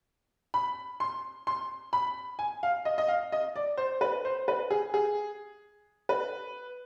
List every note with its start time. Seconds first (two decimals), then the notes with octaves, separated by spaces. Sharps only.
0.54 B5
1.00 C6
1.47 C6
1.93 B5
2.39 G#5
2.63 F5
2.85 D#5
2.98 D#5
3.08 F5
3.32 D#5
3.56 D5
3.78 C5
4.01 B4
4.25 C5
4.48 B4
4.71 G#4
4.94 G#4
6.09 B4